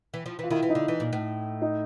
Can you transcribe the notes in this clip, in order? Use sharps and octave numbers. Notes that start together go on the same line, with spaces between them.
E3
F3
E3 F4
D#3 E4
E3
D#4
D3
E3
A#2
A2
D#4